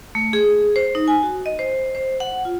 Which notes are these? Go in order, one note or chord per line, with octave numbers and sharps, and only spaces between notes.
A3
G#4
C5
D#4
G#5
F#4
D#5
C5
C5
F#5
F4